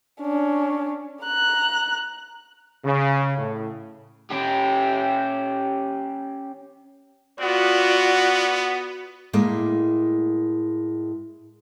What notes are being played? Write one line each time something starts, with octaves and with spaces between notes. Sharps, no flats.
C#4 D4
A#5 F#6
C#3
A2
C#4 G4
B3 F4 F#4 D5
A2 G#3 A#3